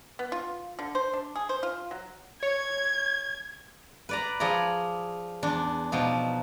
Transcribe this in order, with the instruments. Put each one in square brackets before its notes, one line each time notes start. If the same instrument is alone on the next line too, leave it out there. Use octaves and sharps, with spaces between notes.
[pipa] B3
F4
D3
C5
D4
G#4
C5
F4
F#3
[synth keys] C#5 [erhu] G#6
[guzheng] B4 D5 A#5
F3 G#4 D5 G#5 A#5
E2 D4
B2 F3 D#4